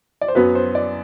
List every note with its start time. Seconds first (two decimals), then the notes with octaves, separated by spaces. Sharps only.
0.21 D5
0.28 C5
0.35 F#2 F#3 B3 B4
0.55 C5
0.75 D5